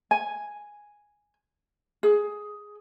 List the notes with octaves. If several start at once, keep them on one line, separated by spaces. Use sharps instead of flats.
G#5
G#4